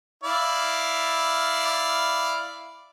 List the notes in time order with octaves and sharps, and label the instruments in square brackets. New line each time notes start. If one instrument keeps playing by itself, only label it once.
[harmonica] E4 D5 F5